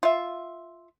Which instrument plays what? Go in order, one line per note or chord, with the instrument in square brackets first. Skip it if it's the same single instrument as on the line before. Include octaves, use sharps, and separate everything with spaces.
[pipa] F4 E5